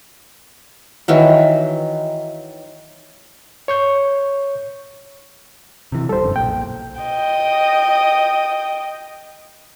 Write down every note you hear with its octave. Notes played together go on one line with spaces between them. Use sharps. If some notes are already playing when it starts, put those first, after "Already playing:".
D#3 E3 F#3
C#5 C#6 G6
C3 E3
D1 G3 A4 C5
G1 F#2 D3
B1 A#2 G5
D#5 G5